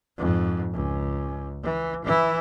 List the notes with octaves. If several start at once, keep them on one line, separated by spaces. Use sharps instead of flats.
F2 G#2
C#2
E3
E3 E4